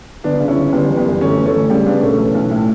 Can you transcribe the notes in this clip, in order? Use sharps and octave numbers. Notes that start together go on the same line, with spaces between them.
G1 B3 D4
C#3
C#4 E4
G1
G1 G3 B3
E3
G3 B3
F#2
G1 A3 C#4
E3
A3 C#4
G1
C#3 G3
C#3 B3 D4
E1 A3 C#4
E3
B1
A2